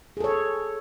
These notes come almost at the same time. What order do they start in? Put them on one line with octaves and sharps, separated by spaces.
G#4 A4 C#5